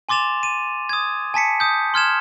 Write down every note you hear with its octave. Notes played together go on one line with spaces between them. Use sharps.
G#5 C6 D6 A6 E7 F7
D#7
D#6 G#6
G#5 A5 B6 C#7
D#6 G6
C6 F6 G#6 E7